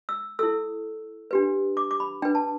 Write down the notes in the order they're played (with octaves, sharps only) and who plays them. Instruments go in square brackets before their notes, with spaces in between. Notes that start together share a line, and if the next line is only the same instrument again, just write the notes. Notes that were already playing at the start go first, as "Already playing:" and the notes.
[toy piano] E6
E4 A4 E6
D4 G4 B4
D6
D6
B5
D4 B4 G5
A5